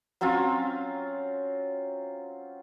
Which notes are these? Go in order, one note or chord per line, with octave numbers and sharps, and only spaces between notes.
F#3 C4 C#4 F4